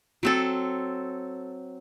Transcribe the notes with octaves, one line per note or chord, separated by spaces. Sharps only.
F#3 C4 A4